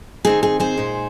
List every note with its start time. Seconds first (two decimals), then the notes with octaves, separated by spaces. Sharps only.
0.25 D#3 C4 D#4 G#4
0.43 G#4
0.60 G#4 C5
0.77 A#2 G#3 D#4